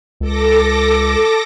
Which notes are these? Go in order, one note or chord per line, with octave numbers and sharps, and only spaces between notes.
C#2 A4 D6 A#6